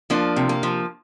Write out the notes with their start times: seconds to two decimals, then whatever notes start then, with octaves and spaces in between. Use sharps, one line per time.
0.10 F3 A#3 D4
0.36 C3
0.49 A#3
0.63 F3